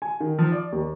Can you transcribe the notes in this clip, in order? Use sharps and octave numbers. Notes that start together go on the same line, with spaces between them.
G#5
D#3
F3
D5
D#2